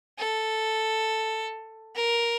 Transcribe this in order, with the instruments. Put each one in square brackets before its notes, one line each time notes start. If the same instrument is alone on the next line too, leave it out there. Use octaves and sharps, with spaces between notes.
[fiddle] A4
A#4